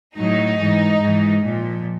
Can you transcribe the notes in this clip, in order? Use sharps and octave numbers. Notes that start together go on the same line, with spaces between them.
A2 F#3 D#4
G#2 E3
G#2 E3
A#2 F3